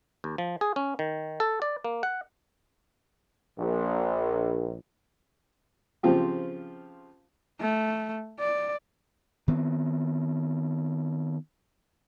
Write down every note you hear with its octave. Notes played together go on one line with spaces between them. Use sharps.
D#2
F3
G#4
C#4
D#3
A4
D5
A#3
F#5
A#1
C#3 F3 C4 F4 G4
A3
D5
D#3 B3 C4